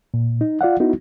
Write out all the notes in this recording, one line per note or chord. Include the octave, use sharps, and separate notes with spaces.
A#2
D#4
F4 D5 F5 F#5
B3 D#4 E4 F#4